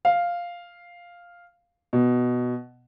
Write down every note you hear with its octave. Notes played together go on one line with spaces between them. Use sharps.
F5
B2